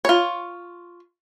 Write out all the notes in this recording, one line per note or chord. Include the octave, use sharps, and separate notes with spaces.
F4 C#5